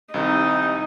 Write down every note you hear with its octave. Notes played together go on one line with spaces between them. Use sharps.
C2 C3 D#3 D#4